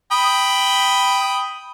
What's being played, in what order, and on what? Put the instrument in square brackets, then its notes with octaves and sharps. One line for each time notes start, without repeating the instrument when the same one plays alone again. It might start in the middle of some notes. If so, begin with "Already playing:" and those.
[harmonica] G5 B5 D#6